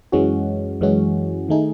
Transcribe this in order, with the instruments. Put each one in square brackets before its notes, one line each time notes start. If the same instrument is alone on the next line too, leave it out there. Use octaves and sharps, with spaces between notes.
[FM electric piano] F#2 E3 G#3 C#4 F#4
F#2 E3 G#3 C#4 F#4
D#3 A3 D#4 G#4